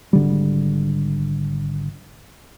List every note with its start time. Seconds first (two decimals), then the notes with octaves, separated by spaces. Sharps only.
0.13 G#1 D3 G3